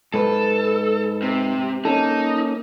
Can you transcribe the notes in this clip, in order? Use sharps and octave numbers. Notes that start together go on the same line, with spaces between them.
G#2 A4 B4
C3
A#3 C#4 D#4 A4